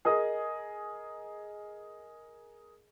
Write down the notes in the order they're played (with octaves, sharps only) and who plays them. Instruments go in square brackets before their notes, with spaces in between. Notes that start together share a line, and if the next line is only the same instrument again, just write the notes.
[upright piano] G#4 A#4 D#5 D#6